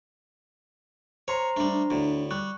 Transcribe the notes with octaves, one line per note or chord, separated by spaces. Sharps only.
C5 C#5 A#5 C6
G3 A3 D4
D4
D2 A2
G3 C#6 F#6